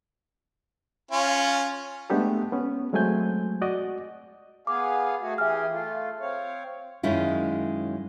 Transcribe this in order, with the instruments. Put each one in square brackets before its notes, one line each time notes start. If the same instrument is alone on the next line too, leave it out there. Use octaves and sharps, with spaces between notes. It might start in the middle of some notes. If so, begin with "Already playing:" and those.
[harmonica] C#4 F4
[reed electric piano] G#3 A3 B3 D4 G4 A4
B3 C#4
F#3 G#3 A3 C4 G#5 G6
F#4 D5 D#5
[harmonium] B3 G#4 F5 [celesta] D6
[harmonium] A3 F#4 G#4
[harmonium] E3 G4 G#4 [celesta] E5 F6
[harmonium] A3 F4
C4 C#5 F5
[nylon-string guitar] F#2 D#3 G#3 C#4 E4 F4